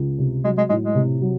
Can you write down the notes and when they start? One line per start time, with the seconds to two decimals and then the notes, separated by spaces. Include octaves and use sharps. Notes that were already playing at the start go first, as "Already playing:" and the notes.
Already playing: C#2
0.19 C3
0.44 F#3 G#3
0.57 G#3
0.69 A2 G#3
0.82 G#3
0.95 C3
1.21 F#3